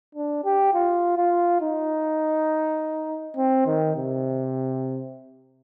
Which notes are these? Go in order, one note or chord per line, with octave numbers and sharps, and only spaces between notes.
D4
G4
F4
F4
D#4
C4
D#3
C3